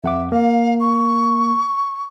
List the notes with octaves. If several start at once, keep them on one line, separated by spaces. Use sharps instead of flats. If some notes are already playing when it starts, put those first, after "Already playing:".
F2 E5 F#5 D6
A#3 F5
C#6